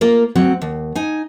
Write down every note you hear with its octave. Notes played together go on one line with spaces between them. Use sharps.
A#3 F4 A#4
D2 F#3 C4 F#5
D#2
D#4 G#5